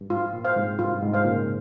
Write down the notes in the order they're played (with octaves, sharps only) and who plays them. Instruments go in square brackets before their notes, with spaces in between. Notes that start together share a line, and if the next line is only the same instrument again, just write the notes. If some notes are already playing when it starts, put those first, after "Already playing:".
[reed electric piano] G2
[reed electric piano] G#2 [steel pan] F4
[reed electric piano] A#2
[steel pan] C5 F5
[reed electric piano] G#2 C3
[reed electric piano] G2 [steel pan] F4
[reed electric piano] G#2
[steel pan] C5 F5
[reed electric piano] A#2 C#3